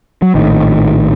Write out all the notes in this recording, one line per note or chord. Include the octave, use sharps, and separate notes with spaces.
F#3
A#1 A2 D#3